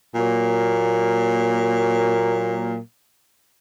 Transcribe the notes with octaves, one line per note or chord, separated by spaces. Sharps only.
A#2 F#3 A#3